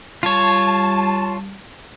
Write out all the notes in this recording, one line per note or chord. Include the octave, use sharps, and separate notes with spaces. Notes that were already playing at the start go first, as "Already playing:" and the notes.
G3 F4 C#5 A5